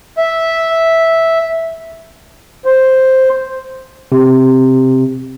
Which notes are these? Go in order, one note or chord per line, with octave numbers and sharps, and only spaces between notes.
E5
C5
C3